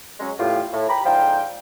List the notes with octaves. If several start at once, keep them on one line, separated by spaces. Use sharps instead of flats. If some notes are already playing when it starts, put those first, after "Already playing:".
F#3 G#3 C#4
E2 A2 F4 G4
A2
G4 A#5 B5
G#2 D3 F3 C5 F5 G5